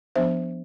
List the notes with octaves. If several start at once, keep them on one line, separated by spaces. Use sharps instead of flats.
F3 B3 D4 C5 E5